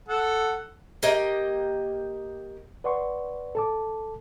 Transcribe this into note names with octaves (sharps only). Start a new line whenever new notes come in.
A4 F#5
A#3 G4 D#5 G5
B4 D5 F#5 C6 C#6
A4 A5 D6